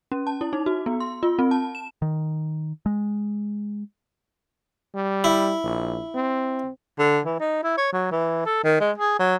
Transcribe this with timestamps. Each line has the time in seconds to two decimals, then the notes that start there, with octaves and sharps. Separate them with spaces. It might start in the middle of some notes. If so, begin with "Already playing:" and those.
0.12 C#4
0.27 A5
0.41 E4
0.53 D#4
0.66 F#4
0.86 B3
1.00 C6
1.23 F4
1.39 C4
1.51 A5
1.75 E7
2.02 D#3
2.86 G#3
4.95 G3
5.24 E4
5.64 A#1
6.15 C4
6.99 D3
7.25 E3
7.40 D#4
7.63 E4
7.77 C#5
7.93 F#3
8.11 E3
8.46 A4
8.64 D#3
8.80 G#3
8.98 G#4
9.19 F#3